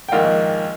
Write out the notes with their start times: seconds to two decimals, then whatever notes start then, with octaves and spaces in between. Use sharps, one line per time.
0.09 G5
0.12 A#1 G#2 D#3 A#3 F5